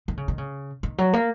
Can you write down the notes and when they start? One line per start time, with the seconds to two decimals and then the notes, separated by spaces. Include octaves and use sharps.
0.08 D#3
0.17 C#3
0.28 D#3
0.38 C#3
0.83 D#3
0.98 F#3
1.13 A#3